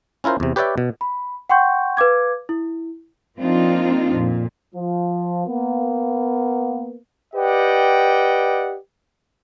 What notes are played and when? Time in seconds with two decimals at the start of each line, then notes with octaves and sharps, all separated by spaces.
0.24 C#4 E4 F4 A#4 C5
0.40 E2 C3
0.56 G4 B4 C#5 D5 E5 G5
0.78 B2
1.01 B5
1.49 F#5 G5 C6 C#6 G6
1.97 B4 F5 D6 G#6
2.49 E4
3.38 F3 A#3 C4 D4 D#4 F4
4.13 F2 A#2
4.74 F3
5.47 A#3 B3
7.34 G4 B4 D5 D#5 F#5 G5